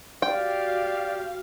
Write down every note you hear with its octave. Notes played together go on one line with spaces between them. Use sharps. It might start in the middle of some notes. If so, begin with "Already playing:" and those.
F#4 G4 D5 F5 G5